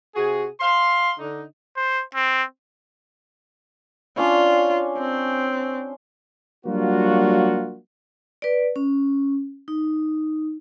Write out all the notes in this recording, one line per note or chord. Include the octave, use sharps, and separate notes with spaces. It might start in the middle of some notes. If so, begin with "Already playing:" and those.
C3 F#4 G#4
F5 C6
D3 D#4
C5
C4
C#4 D4 F4 C#5
C4
F#3 G3 A#3 D4 F4 F#4
B4 D5
C#4
D#4